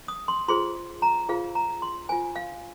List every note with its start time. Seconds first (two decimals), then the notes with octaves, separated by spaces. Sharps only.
0.08 D#6
0.28 C6
0.48 F4 G#4 C5 C6
1.02 A#5
1.29 F4 G#4 C5 F5
1.55 A#5
1.82 C6
2.09 F4 C5 G#5
2.36 F5